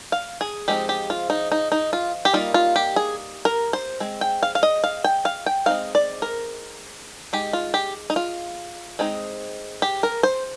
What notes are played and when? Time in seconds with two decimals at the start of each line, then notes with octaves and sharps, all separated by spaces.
0.12 F5
0.41 G#4
0.68 F3 G#3 C4 D#4 G4
0.89 G4
1.10 F4
1.30 D#4
1.52 D#4
1.72 D#4
1.93 F4
2.25 G4
2.33 G3 A#3 D#4 F4
2.54 F4
2.76 G4
2.96 G#4
3.45 A#4
3.73 C5
4.00 G#3 C4
4.21 G5
4.43 F5
4.55 F5
4.63 D#5
4.84 F5
5.04 G5
5.25 F5
5.46 G5
5.66 G#3 C4 D#4 F5
5.95 D5
6.22 A#4
7.33 G#3 D#4 G4
7.53 F4
7.74 G4
8.10 D#4
8.16 F4
8.99 G#3 C4 D#4
9.82 G4
10.03 A#4
10.23 C5